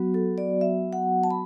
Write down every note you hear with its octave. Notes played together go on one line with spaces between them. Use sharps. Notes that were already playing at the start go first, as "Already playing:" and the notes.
Already playing: F#3 B3 F#4
A4
D5
E5
F#5
A5
B5